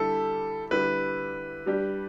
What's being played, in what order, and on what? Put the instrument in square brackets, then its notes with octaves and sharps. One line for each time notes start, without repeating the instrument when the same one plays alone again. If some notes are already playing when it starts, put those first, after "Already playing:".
Already playing: [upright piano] D3 G3 E4 G4 [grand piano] A4
[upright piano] D3 G3 E4 G4 [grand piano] B4
[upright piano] G3 D4 G4